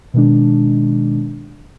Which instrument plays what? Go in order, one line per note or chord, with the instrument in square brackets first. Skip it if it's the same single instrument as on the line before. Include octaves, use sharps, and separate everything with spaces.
[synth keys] B2 D#3 G#3 D4